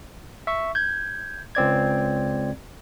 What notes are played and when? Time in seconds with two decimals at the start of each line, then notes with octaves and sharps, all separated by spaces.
0.47 E5 C#6
0.75 G6 G#6
1.55 C#2 C4 D5 G#6